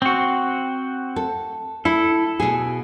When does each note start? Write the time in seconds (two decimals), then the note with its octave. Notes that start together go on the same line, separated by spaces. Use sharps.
0.02 C4 F#4
1.16 A4
1.85 E4 A4
2.40 B2 G#4